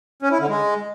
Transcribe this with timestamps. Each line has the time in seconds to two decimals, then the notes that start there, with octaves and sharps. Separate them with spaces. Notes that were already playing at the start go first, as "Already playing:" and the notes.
0.22 C#4
0.31 E4
0.40 D3
0.49 G#3